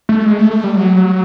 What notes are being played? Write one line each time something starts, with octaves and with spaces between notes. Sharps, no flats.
A3
G#3
A3
A3
G3
F#3